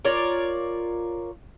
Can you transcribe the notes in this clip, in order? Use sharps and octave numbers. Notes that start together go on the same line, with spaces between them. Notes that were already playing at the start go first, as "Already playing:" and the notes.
F4 A#4 C#5 D5